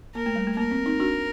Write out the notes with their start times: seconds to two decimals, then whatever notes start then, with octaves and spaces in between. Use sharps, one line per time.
0.15 A#3 A#4
0.26 A3
0.36 G3
0.47 A3
0.57 A#3 A#4
0.71 C4
0.86 C4 D#4
1.00 D4 F#4